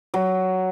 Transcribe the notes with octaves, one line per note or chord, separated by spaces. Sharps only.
F#3